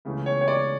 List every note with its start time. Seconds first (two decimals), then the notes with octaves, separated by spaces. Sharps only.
0.05 C#2 C#3 E3 A3
0.26 C#5
0.41 C#5
0.48 D5